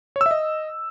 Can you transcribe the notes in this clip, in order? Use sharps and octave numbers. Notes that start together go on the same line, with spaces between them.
C#5
E6
E5
D#5